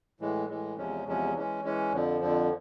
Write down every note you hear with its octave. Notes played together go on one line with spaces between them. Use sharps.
A2 E3 G#3
A2 E3 G#3
E2 C3 F3 G#3 C#4
E2 C3 F3 G#3 C#4
E3 G#3 C#4
E3 G#3 C#4
F2 D3 F3
F2 D3 F3